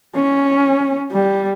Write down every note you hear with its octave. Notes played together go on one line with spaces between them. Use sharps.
C#4
G3